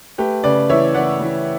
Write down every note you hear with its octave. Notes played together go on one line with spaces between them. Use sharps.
A3 G4 B4
C#3 B4 D5
E3 C#5 E5
E3 D5 F#5
E3